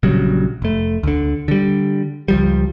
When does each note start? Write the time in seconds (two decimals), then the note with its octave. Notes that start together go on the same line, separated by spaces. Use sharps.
0.03 A#1 C#3 F#3 G3
0.62 F1 A3
1.03 D2 D3
1.48 D3 G3
2.28 C#2 F3 G3